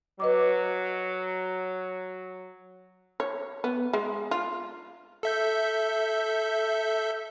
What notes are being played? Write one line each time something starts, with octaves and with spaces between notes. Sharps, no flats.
F#3 B4 D#5 D6
C#5
B3
G#3
F4
A4 E5 G6